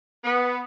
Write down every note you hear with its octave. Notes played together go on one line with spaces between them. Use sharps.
B3